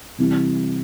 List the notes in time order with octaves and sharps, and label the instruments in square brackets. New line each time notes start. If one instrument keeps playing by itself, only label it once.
[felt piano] C3 E3 G3 C4 E4